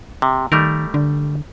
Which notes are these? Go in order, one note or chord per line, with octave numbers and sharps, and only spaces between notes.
C3
D#3 G3 A3 A#4
D3